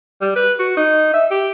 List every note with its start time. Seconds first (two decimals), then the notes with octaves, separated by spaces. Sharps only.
0.22 G3
0.36 B4
0.59 F#4
0.77 D#4
1.14 E5
1.31 G4